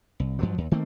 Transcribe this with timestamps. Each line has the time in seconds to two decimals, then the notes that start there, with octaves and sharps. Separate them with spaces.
0.20 C2
0.39 G2 F3 F#3
0.58 D#2
0.72 D#3 A3 A#3 C4